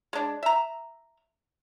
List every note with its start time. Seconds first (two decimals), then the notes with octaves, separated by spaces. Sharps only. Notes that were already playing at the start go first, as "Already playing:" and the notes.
0.13 G#3 D4
0.43 E5 A#5